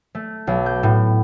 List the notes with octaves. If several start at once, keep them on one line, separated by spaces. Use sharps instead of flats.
A3
B1
G6
A2